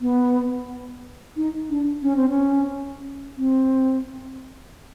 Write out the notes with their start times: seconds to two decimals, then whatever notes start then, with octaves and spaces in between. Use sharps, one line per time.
0.01 B3
1.36 D#4
1.70 D4
2.02 C#4
2.16 C4
2.29 C#4
3.37 C4